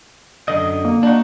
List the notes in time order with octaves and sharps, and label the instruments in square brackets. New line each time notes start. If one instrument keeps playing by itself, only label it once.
[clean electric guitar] F#2 D3 D#5
[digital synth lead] A#3
[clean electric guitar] D4 D#4 F#4